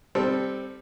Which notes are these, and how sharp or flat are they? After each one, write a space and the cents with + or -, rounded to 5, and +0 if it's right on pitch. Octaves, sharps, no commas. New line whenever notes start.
G3 +10 C4 +0 A4 +0